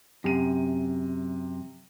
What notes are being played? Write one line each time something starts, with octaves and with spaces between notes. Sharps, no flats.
F#2 C3 D#7